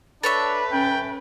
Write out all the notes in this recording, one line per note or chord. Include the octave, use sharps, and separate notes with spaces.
D4 A4 B4 C#5 E5
C#4 G5